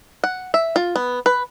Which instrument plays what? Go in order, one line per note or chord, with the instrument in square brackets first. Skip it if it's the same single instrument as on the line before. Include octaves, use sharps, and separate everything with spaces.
[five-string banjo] F#5
E5
F4
B3
B4